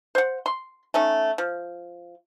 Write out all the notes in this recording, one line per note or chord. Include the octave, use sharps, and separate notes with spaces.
C5 F#5
C6
A3 C#4 D#4
F3